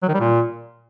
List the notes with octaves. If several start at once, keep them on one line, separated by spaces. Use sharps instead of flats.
F#3
D#3
G3
A#2